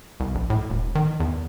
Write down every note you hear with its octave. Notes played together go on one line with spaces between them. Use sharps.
C2
A#1
A2
E1
D#3
E2